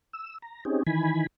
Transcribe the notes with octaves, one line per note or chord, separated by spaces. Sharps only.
E6
A#5
C4 C#4 D#4 G4 G#4
D#3 E3 G#5 B5